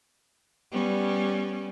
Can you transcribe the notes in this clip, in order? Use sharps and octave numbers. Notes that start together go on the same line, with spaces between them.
G3 B3 C#4